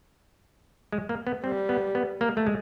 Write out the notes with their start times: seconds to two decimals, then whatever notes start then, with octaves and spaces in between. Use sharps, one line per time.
0.92 G#3
1.09 A#3
1.27 B3
1.44 G3 C4
1.69 B3
1.95 B3
2.21 A#3
2.37 A3
2.46 G#3